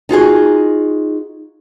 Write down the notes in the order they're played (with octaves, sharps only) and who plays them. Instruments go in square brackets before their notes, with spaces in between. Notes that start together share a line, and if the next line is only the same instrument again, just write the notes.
[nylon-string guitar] D#4 F4 F#4 G#4